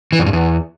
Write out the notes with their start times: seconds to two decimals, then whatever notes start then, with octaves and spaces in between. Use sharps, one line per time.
0.12 E3
0.19 F2
0.26 G2
0.33 E2